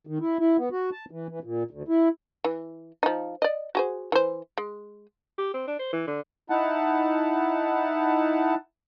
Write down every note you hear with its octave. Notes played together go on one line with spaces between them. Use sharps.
D#3
E4
E4
B3
F#4
A5
E3
E3
A#2
D2
E4
E3
F3 D#4
D5 D#5
F#4 G#4 C5
E3 C5
G#3
G4
C4
D4
C5
E3
D3
D#4 E4 F#5 A5